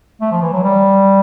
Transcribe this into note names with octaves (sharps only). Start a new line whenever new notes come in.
A3
F3
E3
F#3
G3